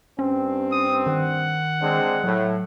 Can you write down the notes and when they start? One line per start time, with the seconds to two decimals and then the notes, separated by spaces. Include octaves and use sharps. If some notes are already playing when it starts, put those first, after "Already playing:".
0.19 G2 C4 C#4
0.72 D#6
1.07 D#3 F#5
1.81 G#3 C4 D4
2.24 A2 F#3